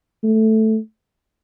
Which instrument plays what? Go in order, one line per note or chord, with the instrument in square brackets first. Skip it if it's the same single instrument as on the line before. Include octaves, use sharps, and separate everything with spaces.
[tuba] A3